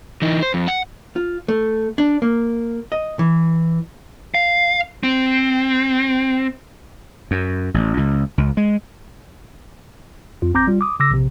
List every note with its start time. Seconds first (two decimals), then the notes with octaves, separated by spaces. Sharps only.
0.22 E3 D#4
0.42 C5
0.54 F2
0.68 F#5
1.16 F4
1.48 A3
1.98 D4
2.22 A#3
2.92 D#5
3.19 E3
4.35 F5
5.03 C4
7.31 F#2
7.74 A1
7.97 C#2
8.38 C#2
8.57 G#3
10.42 F2 F4
10.54 G#1 C4 A#5 D6 G6 A#6
10.67 G3 F4
10.81 D6 D#6
11.00 C#3 D6 E6 A#6
11.11 A#1 C3